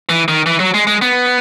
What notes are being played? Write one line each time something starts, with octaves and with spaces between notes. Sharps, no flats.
E3
D#3
E3
F#3
G#3
G#3
B3